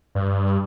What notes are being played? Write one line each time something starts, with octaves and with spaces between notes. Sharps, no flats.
G2